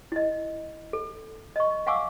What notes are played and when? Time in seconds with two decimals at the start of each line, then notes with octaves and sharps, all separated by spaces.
0.12 E4 D#5
0.93 A4
1.56 D#5 C#6
1.86 F5 F#5 G#5 C#6 D6 E6